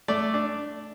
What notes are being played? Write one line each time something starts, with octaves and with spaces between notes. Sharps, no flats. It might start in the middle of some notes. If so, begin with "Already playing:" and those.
A3 D5
D4